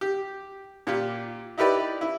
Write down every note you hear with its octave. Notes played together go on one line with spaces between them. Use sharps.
G4
A#2 F4 G4
D#4 E4 G4 B4 D5
E4